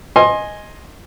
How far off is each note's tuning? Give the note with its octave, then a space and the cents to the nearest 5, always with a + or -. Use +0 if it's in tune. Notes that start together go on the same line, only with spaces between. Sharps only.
D#5 +0 G#5 +0 C6 +20